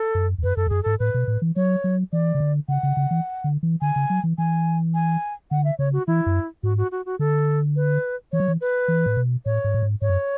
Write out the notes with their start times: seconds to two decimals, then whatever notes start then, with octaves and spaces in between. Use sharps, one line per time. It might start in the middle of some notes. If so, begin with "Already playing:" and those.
Already playing: A4
0.15 F#2
0.38 E2
0.43 F#2 B4
0.57 F#2 A4
0.67 E2
0.70 F#2 G#4
0.83 G#2 A4
1.00 A2 B4
1.14 B2
1.28 A2
1.42 E3
1.56 F#3 C#5
1.84 F#3
2.13 E3 D5
2.35 C#3
2.40 D3
2.68 C#3 F#5
2.83 C#3
2.97 C#3
3.11 E3
3.44 D3
3.63 E3
3.81 D3 G#5
3.96 C#3
4.10 F#3
4.24 E3
4.38 E3 G#5
4.94 G#5
5.51 D3 F#5
5.65 E5
5.79 C#3 C#5
5.93 F#4
6.07 E3 E4
6.26 F#2
6.63 G#2 F#4
6.78 F#4
6.92 F#4
7.06 F#4
7.19 D3 A4
7.76 B4
8.32 E3 C#5
8.40 F#3
8.48 E3
8.61 B4
8.88 E3
9.06 A2
9.17 B2
9.45 A2 C#5
9.64 G#2
9.74 A2
9.82 G#2
10.02 G#2 C#5
10.09 F#2